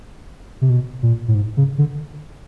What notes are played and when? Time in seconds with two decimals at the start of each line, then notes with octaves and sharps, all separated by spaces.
0.61 C3
0.70 B2
1.03 A#2
1.28 A2
1.35 G#2
1.57 C#3
1.78 D3